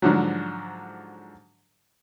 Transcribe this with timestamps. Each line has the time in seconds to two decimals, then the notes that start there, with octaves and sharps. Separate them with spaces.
0.02 G#2 D3 F3 F#3